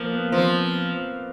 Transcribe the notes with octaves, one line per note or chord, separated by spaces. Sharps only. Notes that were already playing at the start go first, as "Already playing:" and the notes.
Already playing: F3 A#3
B3
F3 C4